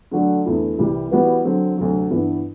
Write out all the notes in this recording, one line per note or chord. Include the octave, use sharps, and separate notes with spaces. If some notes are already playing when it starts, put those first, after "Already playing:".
D3 F#3 A3 D4 F#4
E2 D3 A3 E4
C2 C3 E3 G3
E3 G3 B3 F#4 B4
D3 F#3 C4
D2 C3 F#3
G2 E3 B3